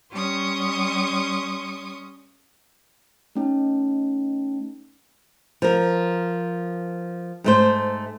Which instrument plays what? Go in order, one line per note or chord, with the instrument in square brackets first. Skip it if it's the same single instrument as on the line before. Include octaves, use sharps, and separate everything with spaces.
[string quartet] G3 C#4 C6 C#6 D#6
[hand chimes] A3 C#4 D#4
[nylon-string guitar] F3 A#4
G#2 A3 C5